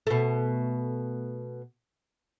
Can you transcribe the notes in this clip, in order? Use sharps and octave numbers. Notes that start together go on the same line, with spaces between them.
B2 A3